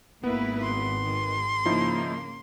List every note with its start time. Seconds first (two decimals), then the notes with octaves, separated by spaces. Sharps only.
0.24 G#1 A#3 B3 E4 B4
0.62 C6
1.06 D#3
1.66 C#3 F3 A#3 D#4 E4